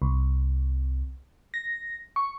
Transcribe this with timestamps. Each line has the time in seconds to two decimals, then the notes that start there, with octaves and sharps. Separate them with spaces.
0.02 C2
1.54 A#6
2.16 C#6